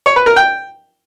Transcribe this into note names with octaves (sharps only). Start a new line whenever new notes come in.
C#5
B4
A#4
G5